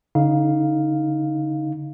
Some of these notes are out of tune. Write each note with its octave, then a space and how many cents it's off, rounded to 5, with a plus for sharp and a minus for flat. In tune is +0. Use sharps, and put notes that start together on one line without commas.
D3 -35 D#4 +10 F5 +0